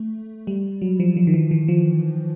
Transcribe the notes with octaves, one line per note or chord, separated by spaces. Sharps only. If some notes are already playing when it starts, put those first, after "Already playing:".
Already playing: A3
G3
F#3
F3
F3
D#3
E3
E3
F3